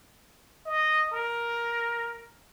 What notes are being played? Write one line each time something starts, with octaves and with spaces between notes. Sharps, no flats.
D#5
A#4